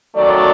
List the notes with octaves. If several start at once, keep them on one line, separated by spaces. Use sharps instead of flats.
F#2 D#3 F#3 A3 D5